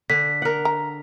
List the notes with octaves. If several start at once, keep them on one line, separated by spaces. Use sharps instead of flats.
D3 B6
A#4 F#5
A#5